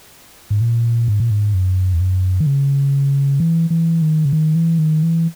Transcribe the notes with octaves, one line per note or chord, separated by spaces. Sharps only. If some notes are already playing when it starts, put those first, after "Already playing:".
G#2
A#2
G#2
A#2
G#2
F#2
E2
F#2
D#3
C#3
E3
E3
D#3
C#3
D#3
E3
D#3
E3